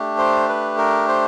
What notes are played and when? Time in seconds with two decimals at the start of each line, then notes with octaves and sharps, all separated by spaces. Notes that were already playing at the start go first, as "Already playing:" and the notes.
Already playing: A3 D4 G4
0.18 C5
0.49 B4
0.78 A#4
1.08 C5